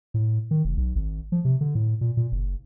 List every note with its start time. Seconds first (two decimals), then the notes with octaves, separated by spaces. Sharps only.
0.14 A2
0.51 D#3
0.65 F1
0.77 B1
0.96 G#1
1.32 F3
1.45 C3
1.61 D3
1.75 A2
2.01 A#2
2.17 A#2
2.32 F#1